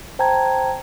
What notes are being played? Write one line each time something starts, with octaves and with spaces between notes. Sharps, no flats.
C5 G5 A5 A#5 G#6